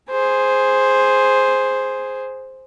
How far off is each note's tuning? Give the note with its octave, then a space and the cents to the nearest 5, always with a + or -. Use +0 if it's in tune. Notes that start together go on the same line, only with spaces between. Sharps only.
G#4 +0 C5 +0